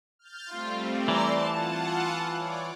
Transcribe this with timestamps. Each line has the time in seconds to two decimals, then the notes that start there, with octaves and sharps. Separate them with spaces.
0.19 F6 G6 A6
0.52 G3 A3 C4 F4
1.08 E3 D5 A#5 C6
1.44 F4 F#5 A5
2.36 C#5 D5 D6